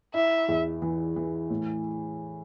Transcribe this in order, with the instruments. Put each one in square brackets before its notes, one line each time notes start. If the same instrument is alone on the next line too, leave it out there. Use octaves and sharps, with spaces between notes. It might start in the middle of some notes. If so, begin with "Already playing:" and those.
[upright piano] E4 [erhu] E5
[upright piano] E2
E3
E3
A2